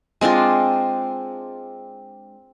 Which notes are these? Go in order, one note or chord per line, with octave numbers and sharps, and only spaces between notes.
G#3 C4 D4 F4